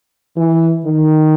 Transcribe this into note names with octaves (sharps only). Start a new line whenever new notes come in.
E3
D#3